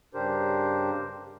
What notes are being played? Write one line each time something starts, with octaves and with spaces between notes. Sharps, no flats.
G2 C#3 D4 G4 A#4 C5